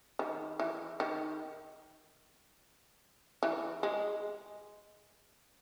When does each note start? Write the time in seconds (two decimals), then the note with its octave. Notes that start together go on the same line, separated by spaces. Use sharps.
0.19 D#3
0.60 E3
1.00 D#3
3.43 E3
3.83 G#3